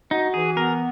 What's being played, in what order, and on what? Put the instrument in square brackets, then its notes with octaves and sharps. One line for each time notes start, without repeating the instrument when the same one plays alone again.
[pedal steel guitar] D#4 [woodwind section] F#4
[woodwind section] E3 [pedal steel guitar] G#4
[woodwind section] B3 [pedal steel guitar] A#4